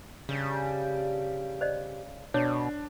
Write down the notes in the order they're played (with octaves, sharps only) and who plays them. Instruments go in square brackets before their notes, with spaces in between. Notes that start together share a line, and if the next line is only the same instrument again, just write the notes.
[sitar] G2 G3 [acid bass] C#3
[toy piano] C5 D5 D#5
[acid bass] B2 [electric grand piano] D4 [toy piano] C#5